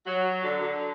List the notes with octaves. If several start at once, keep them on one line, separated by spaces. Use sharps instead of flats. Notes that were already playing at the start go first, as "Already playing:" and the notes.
F#3
D3
D3